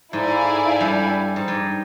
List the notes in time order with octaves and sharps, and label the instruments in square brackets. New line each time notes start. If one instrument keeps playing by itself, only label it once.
[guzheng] G#2 [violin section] E4 A4 D5 F5 G#5
[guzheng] G2
G#2
G2